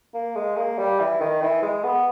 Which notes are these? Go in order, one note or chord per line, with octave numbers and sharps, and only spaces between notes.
A#3
G#3
A#3
G3
E3
D#3
E3
G#3
B3